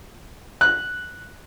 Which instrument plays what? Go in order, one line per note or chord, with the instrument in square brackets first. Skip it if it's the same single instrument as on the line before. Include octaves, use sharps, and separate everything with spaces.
[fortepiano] F#6